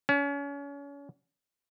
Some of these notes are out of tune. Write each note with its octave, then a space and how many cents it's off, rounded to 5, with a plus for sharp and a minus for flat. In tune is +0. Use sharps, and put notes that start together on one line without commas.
C#4 +35